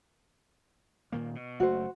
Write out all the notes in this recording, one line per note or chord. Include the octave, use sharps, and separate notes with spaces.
A#2 D#3 A#3
B2
F#1 A3 F#4 C5